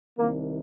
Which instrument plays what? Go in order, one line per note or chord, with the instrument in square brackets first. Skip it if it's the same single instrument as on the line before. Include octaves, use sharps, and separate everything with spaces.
[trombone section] C2 C3 D#3 A#3